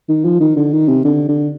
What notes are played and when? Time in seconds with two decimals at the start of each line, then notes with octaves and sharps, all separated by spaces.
0.09 D#3
0.25 F3
0.41 D#3
0.56 D3
0.73 D#3
0.88 C3
1.05 D3
1.28 D3